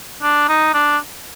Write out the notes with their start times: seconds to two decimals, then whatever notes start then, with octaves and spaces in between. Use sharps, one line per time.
0.22 D4
0.49 D#4
0.74 D4